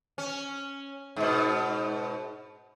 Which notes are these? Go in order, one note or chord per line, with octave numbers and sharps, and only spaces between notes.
C#4
G#2 B2